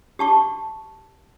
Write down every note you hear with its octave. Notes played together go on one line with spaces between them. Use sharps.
G4 A5 C#6